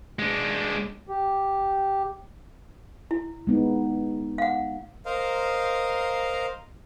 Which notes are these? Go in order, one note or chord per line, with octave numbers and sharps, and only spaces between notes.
G#3 D4
G4
E4
G#3 B3 D#4
F5 F#5
A#4 C5 D#5 F5 A#5